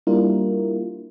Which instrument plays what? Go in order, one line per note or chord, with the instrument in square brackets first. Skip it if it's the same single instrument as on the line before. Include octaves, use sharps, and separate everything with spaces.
[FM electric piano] G3 A#3 D4 E4 F4 A#4